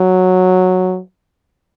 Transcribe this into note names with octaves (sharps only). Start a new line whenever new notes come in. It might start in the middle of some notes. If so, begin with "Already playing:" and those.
Already playing: F#3